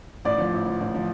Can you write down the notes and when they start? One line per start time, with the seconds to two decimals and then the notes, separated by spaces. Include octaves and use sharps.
0.25 A1 D5
0.38 F3
0.53 A1
0.66 F3
0.80 A1
0.95 F3